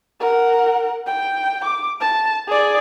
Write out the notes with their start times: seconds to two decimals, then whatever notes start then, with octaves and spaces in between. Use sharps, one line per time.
0.20 A#4 F#5
1.07 G5
1.65 D6
2.00 A5
2.48 G#4 D5